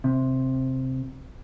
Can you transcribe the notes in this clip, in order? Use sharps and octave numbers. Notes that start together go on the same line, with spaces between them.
C3